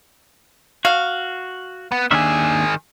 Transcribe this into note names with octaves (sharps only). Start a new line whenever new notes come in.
F#4 F5
B3
D#2 D#3 D4 G#4 E5